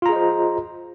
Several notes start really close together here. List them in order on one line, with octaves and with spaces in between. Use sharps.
F4 A#5 G#4 D#5 C5